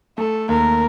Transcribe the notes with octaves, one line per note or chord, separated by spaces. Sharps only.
A3 A4
D#2 A#4